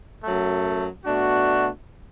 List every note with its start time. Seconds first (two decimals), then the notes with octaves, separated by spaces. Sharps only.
0.23 F#2 F#3 A3
1.04 B2 A3 D4 F#4